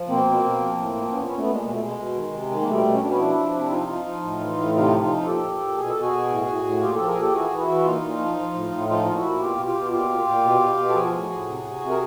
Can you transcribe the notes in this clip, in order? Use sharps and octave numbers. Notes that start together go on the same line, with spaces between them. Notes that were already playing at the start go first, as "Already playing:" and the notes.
Already playing: F3
B2 A#3 C4
B2
B2
F3
A2
F3
A#2 B3 C#4
A#2 B3 C#4
A3 B3
A#2 G#3
B2 G#3
A3
B2 G#3
B2
D#3
C3
D#3
A#3
B2 G3 A3
B2
C#4
B2 D4
B3 C#4
F3 D4 E4
F3
C3
F3 D#4 F4
F3
F3
A2
E3
A2
C3 D#4 F4
F3
D#4 F4
F3
A#2 G4 A4
A#2
A#2
B2 G#4
A4
B2
F#4 G#4
B2
A2
A2
A2
A#2 F4 G4
F3 G4 A4
G#4 A#4
A#2 G4 A4
E3 F#4 G#4
E3
E4 F#4
E3
A#2 D#4 F4
A#2
F3
F3
A2
A2
F3 D#4 F4
A#2 F4
E4 F#4
A#2
B2 F4 G4
B2
F4 G4
B2
A#2 F4 G4
A#2
A#2
B2
B2
B2
A4
F3 F#4 G#4
A2
A2
C3
C3
C3
A#4